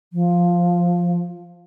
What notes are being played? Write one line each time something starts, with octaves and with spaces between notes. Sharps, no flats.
F3